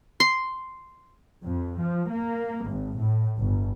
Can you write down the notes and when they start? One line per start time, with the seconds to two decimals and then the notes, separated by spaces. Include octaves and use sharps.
0.20 C6
1.43 F2
1.80 F3
2.10 A#3
2.67 G#1
2.98 A2
3.39 G1